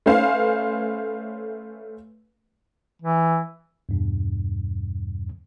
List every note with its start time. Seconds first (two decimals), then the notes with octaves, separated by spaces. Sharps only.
0.06 A3 C#4 B4 C5 F5 G#5
3.02 E3
3.89 E2 G2 B2